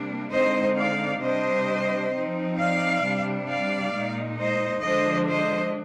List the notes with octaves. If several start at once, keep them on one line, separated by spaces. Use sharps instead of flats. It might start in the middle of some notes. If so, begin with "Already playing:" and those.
Already playing: C3 G3 A#3 D4
D3 G#3 C4 D#4 C5 D#5
D5 F5
C3 G3 D4 C5 D#5
F3 C4 D#4
D5 F5
C3 G3 D4
D5 F5
A#2 G#3 D#4
C5 D#5
D3 F3 G#3 D4 C5 D#5
C5 D#5